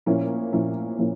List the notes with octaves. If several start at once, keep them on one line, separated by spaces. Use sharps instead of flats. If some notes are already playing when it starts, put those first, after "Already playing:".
A#2 F3 A#3 C#4 E4
A#2 F3 A#3 C#4 E4
A#2 F3 A#3 C#4 E4